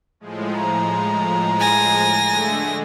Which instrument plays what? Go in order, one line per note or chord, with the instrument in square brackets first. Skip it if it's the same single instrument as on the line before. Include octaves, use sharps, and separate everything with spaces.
[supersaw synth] A2 F3 G#3
[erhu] A#5
[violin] G#5 A#6
[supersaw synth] D3 G#3 A3